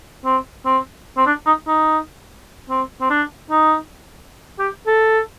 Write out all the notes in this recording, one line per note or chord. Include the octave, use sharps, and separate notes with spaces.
C4
C4
C4
D4
D#4
D#4
C4
C4
D4
D#4
G4
A4